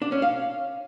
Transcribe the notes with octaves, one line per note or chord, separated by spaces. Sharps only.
D4
C#4
F5